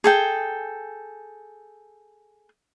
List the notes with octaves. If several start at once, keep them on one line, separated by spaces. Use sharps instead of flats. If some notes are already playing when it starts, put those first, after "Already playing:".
G#4 A4 G5